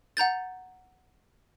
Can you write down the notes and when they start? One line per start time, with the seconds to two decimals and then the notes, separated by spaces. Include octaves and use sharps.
0.17 F#5 A#5 G6 A6